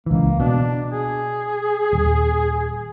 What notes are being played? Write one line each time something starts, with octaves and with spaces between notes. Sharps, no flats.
C#2 E3 A#3
B2 D4
G#4
D#1